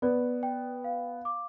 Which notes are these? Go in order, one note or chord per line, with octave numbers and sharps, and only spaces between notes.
B3 D5
G5
F5
D6